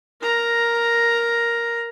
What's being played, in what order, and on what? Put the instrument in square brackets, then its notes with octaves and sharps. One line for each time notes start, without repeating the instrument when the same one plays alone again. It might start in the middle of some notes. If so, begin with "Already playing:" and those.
[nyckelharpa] A#4 A#5